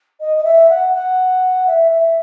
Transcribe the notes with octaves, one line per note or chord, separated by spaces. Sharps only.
D#5
D#5
E5
F#5
F#5
E5
E5